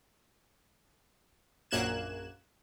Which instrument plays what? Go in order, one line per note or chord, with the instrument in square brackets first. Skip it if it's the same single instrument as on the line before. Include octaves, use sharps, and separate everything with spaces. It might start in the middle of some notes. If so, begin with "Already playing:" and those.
[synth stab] A#1 F#2 A#3 F#6 G#6 E7